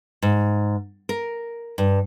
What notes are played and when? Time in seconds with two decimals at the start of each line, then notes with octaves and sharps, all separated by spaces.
0.22 G#2
1.09 A#4
1.78 G2